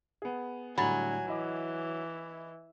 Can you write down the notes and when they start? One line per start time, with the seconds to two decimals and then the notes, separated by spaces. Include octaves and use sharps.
0.22 B3 G#4
0.78 A2 D3 F#3 G3 G#5 B5 A6
1.28 E3 E4 D#5 D6